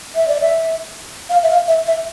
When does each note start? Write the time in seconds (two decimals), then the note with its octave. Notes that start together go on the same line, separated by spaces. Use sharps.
0.15 E5
0.28 D5
0.41 E5
1.30 F5
1.43 E5
1.49 F5
1.68 E5
1.87 E5